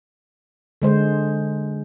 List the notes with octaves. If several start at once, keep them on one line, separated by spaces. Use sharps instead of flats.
D3 G#3 C5